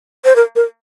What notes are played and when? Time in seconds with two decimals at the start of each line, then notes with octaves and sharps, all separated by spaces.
0.25 C5
0.36 A#4
0.56 A#4